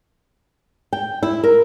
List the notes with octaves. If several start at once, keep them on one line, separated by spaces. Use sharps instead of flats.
G5
E4
A#4